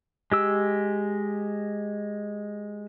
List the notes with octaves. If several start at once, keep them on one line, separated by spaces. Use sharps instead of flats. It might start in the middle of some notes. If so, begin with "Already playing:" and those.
G#3 G4 E6